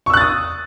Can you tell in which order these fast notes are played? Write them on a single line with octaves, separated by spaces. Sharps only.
C#6 E6 F#6 A6 D#6